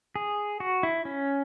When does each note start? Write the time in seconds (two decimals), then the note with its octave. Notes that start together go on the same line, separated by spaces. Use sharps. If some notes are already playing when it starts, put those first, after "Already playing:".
0.16 G#4
0.60 F#4
0.83 E4
1.05 C#4